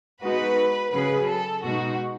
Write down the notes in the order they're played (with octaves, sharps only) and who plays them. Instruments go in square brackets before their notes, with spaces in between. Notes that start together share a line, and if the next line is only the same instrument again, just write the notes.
[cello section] G#3 B3 D#4 F#4 [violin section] B4
[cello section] C#3 F#3 C#4 G#4 [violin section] B4
[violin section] A4
[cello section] B2 G#3 D#4 [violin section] F#4